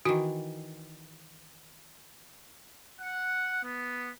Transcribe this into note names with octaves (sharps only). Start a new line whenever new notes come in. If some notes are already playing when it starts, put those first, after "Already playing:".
D#3 E3 F#4
F#5
B3